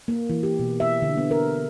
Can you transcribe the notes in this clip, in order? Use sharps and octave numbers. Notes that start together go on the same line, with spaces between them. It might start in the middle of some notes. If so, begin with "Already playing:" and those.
A#3
E3
G4
B2
E5
D3
B3
A#4